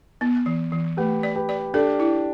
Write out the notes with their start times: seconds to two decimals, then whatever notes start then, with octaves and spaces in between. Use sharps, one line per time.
0.21 B3
0.46 E3
0.72 E3
0.97 A3 G4 B4
1.23 D5
1.36 G4 B4
1.49 D5
1.74 D4 G4 A4
1.99 E4